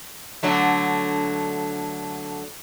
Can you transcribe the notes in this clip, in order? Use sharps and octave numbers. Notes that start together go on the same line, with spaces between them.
D3 F#3 A3